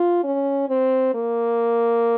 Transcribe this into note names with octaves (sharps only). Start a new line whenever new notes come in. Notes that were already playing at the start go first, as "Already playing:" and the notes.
Already playing: F4
C#4
C4
A#3